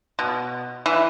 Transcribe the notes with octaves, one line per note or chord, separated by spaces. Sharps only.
B2
E3